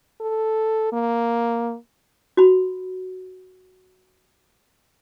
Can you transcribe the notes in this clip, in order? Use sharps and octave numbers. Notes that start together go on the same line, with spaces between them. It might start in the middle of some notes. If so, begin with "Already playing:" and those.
A4
A#3
F#4 B5